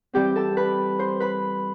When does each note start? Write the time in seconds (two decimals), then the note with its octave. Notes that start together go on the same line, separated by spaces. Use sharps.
0.13 E3 G3 C4 G4 G5
0.36 A4 A5
0.57 B4 B5
0.99 C5 C6
1.20 B4 B5